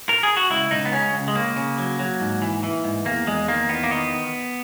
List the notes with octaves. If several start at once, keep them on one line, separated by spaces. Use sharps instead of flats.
A#4
G#4
F#4
C#2 E4
C#2 D#4
B3
C#3 C#4
C#2
G#3
C#3 A#3
C#3
F#3
F#3
G#2
E3
E3
G#2
E2 A#3
E2 G#3
D#3 A#3
E2 B3
A#3
D#3 B3